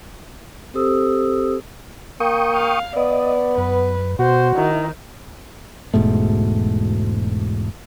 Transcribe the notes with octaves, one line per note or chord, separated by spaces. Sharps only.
C4 G4 A4 C5 D#6 E6
A#3 G5 C#6 D#6
F5
B3 D5 D#5
F#2 B4
B2 F#4 C5
D#3 E4
E1 G#2 B2 A3